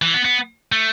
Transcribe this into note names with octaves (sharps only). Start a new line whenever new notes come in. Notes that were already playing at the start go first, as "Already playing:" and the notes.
E3
B3
B3
A3